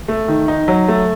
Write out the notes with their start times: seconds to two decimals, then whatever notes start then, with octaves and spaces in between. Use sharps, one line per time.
0.08 A3
0.28 D#3
0.48 D#4
0.68 F#3
0.88 A3